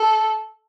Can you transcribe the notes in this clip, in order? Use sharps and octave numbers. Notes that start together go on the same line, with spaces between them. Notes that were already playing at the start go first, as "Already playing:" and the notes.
Already playing: A4